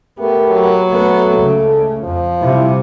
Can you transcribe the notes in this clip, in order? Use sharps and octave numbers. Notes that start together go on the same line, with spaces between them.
A3 B3 G4 A#4
F#3
A3 B3
C#2 C#3
F2 F3
C3 G3 E4